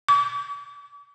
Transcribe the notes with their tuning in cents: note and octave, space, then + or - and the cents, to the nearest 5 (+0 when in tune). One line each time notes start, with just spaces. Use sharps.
D6 -45